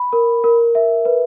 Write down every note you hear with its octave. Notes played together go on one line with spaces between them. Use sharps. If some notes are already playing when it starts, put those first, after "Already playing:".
Already playing: B5
A#4
A#4
E5
B4